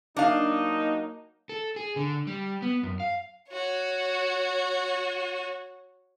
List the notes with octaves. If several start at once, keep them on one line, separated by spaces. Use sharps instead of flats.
F#3 A#3 D4 D#4 F5
A4
G#4
D3
G3
B3
F#2
F5
F#4 C#5